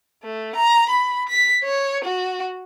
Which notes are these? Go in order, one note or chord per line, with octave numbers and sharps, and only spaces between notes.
A3
A#5
B5
B6
C#5
F#4